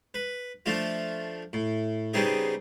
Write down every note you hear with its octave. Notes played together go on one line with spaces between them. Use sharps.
B4
F3 A3 D4 F4
A2
C#3 G3 B3 C4 D#4 G#4